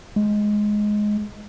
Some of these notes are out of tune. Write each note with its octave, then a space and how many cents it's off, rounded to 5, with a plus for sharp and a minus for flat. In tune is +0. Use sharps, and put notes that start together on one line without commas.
G#3 +10